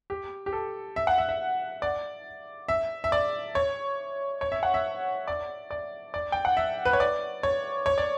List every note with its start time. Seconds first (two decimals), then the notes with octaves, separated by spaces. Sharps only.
0.10 G4
0.46 G4
0.53 A4
0.96 E5
1.07 F#5
1.18 E5
1.29 E5
1.82 D5
2.68 E5
3.04 E5
3.12 D5
3.55 C#5
4.41 C#5
4.52 E5
4.63 F#5
4.74 E5
5.28 D5
5.71 D5
6.14 D5
6.32 G5
6.45 F#5
6.57 E5
6.85 B4
6.93 C#5
7.00 D5
7.43 C#5
7.86 C#5
7.98 D5